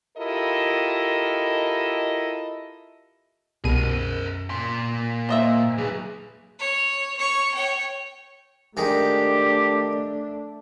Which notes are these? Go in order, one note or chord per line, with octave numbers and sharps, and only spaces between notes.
E4 F4 G4 A4 A#4 D#5
C2 F#2 B2 G#4 A#4 D#7
A#2 C6
A#3 C5 D#5 E5
F#3 G#4 B4
C#5
C#5 C#6
C#5 G5
D#3 G#3 A3 D4 G4